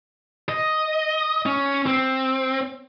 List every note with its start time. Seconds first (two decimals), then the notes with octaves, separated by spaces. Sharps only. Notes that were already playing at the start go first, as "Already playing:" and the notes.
0.49 D#5
1.46 C#4
1.86 C4